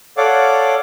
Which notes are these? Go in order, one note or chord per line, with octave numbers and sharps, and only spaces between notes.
A4 C#5 D5 F5 F#5 D6